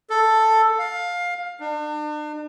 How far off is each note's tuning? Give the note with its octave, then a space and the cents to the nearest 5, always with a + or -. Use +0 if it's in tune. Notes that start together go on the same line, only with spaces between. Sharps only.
A4 +5
F5 +15
D4 +40